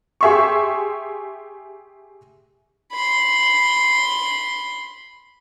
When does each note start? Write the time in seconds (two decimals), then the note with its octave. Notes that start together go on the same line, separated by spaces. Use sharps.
0.21 G4 G#4 E5 C6 C#6
2.92 B5 C6